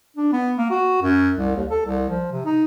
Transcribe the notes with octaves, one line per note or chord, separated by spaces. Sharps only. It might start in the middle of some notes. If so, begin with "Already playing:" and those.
D4
B3
A#3
F#4
F#2
C2
D#2
A4
C2
F3
C3
D#4